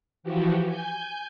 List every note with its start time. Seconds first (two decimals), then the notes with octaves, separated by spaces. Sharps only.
0.23 E3 F3 F#4 G4
0.64 G#5 G6